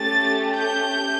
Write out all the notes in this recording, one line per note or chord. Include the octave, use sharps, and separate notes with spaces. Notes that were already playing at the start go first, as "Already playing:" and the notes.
Already playing: A3 C#4 G4 A6
G6